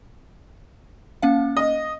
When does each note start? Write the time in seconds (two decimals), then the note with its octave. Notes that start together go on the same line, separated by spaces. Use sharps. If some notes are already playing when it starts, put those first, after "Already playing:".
1.22 A#3 C#4 F5
1.57 D#5